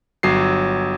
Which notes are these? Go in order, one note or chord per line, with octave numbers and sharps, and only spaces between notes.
G1 F#3 C7